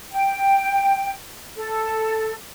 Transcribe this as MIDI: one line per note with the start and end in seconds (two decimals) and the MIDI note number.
0.12 1.12 79
1.57 2.35 69